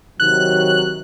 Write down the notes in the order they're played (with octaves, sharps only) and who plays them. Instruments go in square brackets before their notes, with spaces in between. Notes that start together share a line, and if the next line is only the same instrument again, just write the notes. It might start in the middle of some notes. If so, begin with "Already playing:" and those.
[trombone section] C3 D#3 F#3 [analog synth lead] F#6